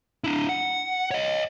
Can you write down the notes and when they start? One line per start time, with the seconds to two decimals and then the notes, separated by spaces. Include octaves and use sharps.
0.24 D4 E4
0.49 F#5
1.11 C#5 D#5